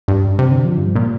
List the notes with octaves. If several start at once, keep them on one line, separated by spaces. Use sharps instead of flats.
G2
C3
D3
F3
G2
A#2